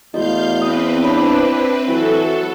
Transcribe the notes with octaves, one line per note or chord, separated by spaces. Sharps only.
E2 A3 F#4 D#5 F5 G6
C4 B4 D#6
D4 E4 C#5 B5
E3 F#3 F#4 A4